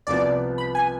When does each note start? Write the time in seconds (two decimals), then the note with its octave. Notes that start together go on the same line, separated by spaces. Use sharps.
0.07 C2 C3 F3 B3 D5
0.58 B5
0.75 G#5